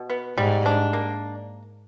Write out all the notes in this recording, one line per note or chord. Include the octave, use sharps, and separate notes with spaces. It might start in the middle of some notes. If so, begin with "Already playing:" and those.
Already playing: B2
B3
G#2 G3
D4
A#3